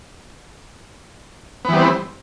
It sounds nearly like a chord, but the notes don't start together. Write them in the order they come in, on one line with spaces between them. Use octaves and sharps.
B3 E3 G3 C4